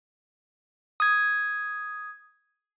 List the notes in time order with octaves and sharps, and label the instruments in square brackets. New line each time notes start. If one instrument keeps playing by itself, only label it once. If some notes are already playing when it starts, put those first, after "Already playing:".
[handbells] D#6 G#6